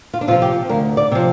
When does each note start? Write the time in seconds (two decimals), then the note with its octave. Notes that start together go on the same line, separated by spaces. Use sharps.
0.14 F4
0.21 D4
0.27 C3 F4
0.31 F3
0.42 G4
0.69 D2 A#4
0.97 D5
1.11 C3 F3